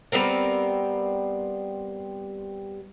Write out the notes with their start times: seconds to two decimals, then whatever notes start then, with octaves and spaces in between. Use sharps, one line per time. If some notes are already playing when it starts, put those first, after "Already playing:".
0.12 G3 B3 C4 A#4